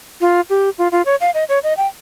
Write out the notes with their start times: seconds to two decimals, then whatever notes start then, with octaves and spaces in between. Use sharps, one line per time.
0.21 F4
0.50 G4
0.78 F4
0.92 F4
1.06 C#5
1.21 F5
1.34 D#5
1.49 C#5
1.63 D#5
1.77 G5